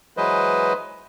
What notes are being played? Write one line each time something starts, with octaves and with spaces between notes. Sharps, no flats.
E3 F#3 G#3 B4 C5 D#5